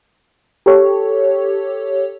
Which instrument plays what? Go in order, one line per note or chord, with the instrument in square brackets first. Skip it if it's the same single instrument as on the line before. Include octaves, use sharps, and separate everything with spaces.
[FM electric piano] G4 A4 C#5